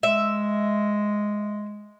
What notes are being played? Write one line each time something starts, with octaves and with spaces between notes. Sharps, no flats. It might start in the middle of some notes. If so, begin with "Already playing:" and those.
G#3 E5